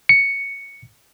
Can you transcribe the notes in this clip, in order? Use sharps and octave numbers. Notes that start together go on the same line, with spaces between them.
C#7